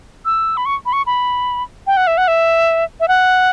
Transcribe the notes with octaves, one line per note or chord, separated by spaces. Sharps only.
E6
B5
C#6
B5
C#6
B5
G5
F#5
E5
F#5
E5
E5
F#5